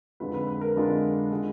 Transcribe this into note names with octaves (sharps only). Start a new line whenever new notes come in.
F2 D3 G#3 D4 F4 B4
B4
B4
A#4
F2 D3 G#3 D4 F4
D3 G#3